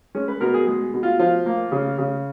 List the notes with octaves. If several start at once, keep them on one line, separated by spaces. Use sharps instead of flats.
G#3 C#4
B4
B2 A#4
G#4
G#3 G#4
B2
F4
F3 F4
A#3
C#3
C#3